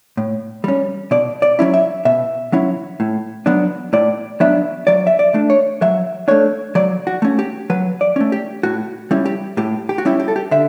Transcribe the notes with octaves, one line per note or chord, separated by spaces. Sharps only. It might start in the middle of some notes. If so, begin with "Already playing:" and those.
A2
G3 C#4
B2 D5
D5
F#3 C#4 E4
E5
B2 E5
F#3 C#4 E4
A2
F#3 B3 D4
A2 D5
F#3 B3 D4 E5
F#3 D5
E5
D5
A3 D4
C#5
F#3 E5
A3 D4 C#5
F#3 D5
F#4
A3 C#4
G4
F#3 B4
D5
A3 C#4
G4
A2 F#4
G3 C#4 E4
G4
A2 G4
G4
F#4
G3 C#4 E4 G4
G4
A4
G4
D3 E5